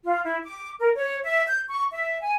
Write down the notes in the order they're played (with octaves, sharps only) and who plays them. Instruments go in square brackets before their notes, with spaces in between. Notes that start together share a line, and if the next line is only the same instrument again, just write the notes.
[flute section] F4
E4
D6
A#4
C#5
E5
G6
C#6
E5
G#5